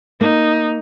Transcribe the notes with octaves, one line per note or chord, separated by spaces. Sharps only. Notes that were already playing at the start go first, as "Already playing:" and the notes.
A#3 D#4